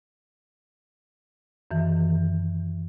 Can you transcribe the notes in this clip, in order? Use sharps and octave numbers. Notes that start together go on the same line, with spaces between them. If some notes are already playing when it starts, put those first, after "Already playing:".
F#2 D#3 E3